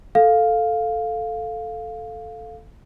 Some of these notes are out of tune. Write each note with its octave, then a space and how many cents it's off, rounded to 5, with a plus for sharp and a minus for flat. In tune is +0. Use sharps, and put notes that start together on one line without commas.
A4 +0 F5 +5